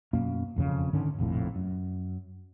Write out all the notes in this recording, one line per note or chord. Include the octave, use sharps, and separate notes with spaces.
F#2 B2 A#3 C#4
E1 F2 C#3
G#2 D3 D#3 C#4
F1 A#1 F2 A2
F#2